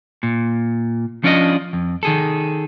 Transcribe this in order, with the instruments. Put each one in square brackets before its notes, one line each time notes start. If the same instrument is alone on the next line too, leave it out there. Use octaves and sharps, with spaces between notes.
[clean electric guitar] A#2
F3 C#4 D4 F4 D5 D#5
F2
D#3 G#4 A4